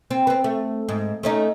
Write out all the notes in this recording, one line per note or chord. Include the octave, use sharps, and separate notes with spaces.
C4
B3 C4
A3
G#2
A3 C#4 D#4